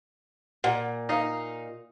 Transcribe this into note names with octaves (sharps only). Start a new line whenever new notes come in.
A#2 F#5 G#5
D#4 D#5 F5